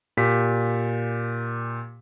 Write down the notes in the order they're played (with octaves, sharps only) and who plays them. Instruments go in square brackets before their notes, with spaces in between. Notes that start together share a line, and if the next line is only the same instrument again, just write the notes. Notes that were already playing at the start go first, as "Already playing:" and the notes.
[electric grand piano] A#2 G4 B6